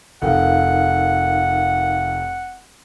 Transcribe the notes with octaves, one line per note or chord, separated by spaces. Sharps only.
F1 D#4 A#4 F5 F#5